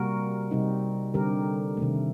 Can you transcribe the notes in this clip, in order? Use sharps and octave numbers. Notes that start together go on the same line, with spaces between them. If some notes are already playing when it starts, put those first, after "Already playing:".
Already playing: C3 G3 A#3 F#4 A#4
C3 G3 C4 D#4
D3 G3 C4 G4 A#4
C3 D#3 A3